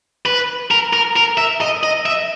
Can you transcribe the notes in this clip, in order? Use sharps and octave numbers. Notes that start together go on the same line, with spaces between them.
B4
A#4
A#4
A#4
E5
D#5
D#5
E5